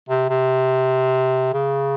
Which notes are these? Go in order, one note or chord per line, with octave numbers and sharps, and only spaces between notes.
C3
C3
C#3